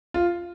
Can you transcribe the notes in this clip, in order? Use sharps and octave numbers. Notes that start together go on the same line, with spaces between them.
F4